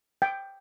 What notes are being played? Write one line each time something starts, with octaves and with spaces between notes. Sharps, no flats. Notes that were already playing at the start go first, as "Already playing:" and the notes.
G5